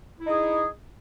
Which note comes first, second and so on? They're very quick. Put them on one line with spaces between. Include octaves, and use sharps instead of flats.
E4 D#4 G#4